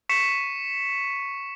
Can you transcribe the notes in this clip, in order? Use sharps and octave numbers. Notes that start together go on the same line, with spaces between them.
C#6 B6 C#7 E7